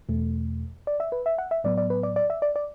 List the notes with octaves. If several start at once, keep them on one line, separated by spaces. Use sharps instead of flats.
E2 B2 A3
D5
E5
B4
E5
F#5
E5
A2 F#3 B3 D5
D5
B4
D5
D5
E5
D5
D5